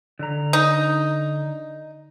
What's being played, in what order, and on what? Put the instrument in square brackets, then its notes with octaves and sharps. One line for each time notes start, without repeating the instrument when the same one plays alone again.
[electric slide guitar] D3 A#5
[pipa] D#4